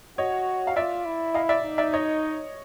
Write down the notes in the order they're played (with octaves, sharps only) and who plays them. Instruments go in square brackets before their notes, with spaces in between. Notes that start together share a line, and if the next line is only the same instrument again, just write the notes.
[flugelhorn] F#4 [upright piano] C#5 D#5
[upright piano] F5
[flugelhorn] F4 [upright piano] D5 E5
[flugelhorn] E4
[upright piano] D#5 F5
D5 E5
[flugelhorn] D#4
[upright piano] D5 E5
C#5 D#5